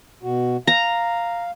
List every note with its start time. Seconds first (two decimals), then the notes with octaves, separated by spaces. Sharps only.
0.23 B2 F#4
0.67 F5 A#5